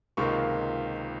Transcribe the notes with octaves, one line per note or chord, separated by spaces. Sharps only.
C#2 C3 D#3 A#3 F4 C#6